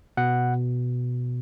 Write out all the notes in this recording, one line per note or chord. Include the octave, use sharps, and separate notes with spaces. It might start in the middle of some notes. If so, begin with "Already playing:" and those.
B2 F#5